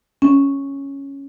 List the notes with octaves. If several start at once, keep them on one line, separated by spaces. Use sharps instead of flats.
C#4